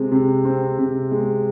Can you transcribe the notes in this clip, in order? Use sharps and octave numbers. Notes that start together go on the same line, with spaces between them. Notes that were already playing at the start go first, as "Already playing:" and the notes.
Already playing: C3 G#3 C4
C3
C4
C3
G#3